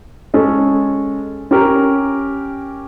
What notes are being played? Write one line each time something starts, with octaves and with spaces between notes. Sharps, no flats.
G#3 C#4 A4
C#4 G4 A#4